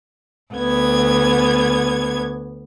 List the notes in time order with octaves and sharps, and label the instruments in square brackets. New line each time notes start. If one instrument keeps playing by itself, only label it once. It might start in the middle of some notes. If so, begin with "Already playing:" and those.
[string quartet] D2 B3 G#6